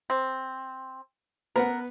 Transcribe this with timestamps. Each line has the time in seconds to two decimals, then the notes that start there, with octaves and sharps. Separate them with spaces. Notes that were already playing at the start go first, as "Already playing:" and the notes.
0.10 C4
1.56 B3 A#4 B4 F#5